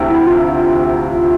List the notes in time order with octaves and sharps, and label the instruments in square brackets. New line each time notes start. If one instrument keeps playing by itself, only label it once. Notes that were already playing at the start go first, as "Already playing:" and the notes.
Already playing: [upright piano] D2 C3 E3
[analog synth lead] E4
F4